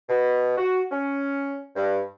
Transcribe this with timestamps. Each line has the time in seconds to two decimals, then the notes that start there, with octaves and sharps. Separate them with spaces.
0.09 B2
0.57 F#4
0.91 C#4
1.76 G2